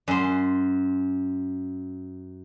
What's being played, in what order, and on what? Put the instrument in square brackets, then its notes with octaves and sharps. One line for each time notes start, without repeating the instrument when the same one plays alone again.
[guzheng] F#2 C6